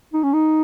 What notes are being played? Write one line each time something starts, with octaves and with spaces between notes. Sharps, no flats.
D#4
C#4
D#4